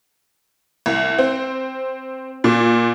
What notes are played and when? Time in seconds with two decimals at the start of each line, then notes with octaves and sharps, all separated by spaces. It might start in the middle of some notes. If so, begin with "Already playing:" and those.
0.86 C2
1.18 C4
2.44 A#2